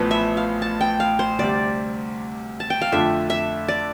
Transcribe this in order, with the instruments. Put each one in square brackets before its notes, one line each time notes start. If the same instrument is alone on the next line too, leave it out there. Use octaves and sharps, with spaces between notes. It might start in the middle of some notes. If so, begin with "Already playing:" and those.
Already playing: [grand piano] A1 A2 F3 B3 [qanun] B4
[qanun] E5
F5
A5
G5
F5
C5
[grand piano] D2 C3 G3 [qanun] D5
[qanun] A5
G5
F5
[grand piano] F2 D3 A3 D4 F4 [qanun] E5
[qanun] E5
D5